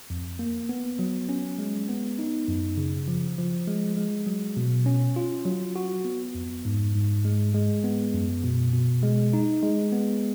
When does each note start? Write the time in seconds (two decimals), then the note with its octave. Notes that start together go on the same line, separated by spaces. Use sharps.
0.10 F2
0.39 A#3
0.69 B3
0.99 F#3
1.29 C#4
1.59 G#3
1.89 B3
2.19 D#4
2.48 F#2
2.77 C#3
3.08 F3
3.38 F3
3.67 G#3
3.97 G#3
4.27 F#3
4.57 B2
4.86 C#4
5.16 F4
5.45 F#3
5.76 F#4
6.05 B3
6.35 F2
6.65 G#2
6.95 G#2
7.25 G#3
7.54 G#3
7.84 B3
8.14 F#2
8.44 B2
8.73 B2
9.03 G#3
9.33 D#4
9.63 G#3
9.92 B3